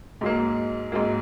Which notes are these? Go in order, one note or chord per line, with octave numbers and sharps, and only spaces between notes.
G#2 F#3 A#3
G#2 F#3 A#3